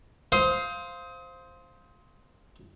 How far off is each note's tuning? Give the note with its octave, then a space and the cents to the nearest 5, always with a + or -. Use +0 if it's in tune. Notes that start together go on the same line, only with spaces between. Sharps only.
C5 +0 F5 +0 D#6 +35